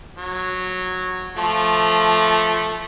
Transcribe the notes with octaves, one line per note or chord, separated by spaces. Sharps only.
F#3
F3 A3